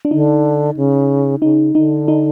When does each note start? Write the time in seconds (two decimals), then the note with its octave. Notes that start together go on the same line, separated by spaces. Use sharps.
0.05 D4
0.11 D3 D#4
0.77 C#3
1.42 C#3 D#4
1.75 D3 D#4
2.08 D#4